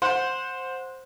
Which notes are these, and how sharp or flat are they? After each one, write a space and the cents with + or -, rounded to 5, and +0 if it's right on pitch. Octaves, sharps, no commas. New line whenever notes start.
C5 +0 F#5 -20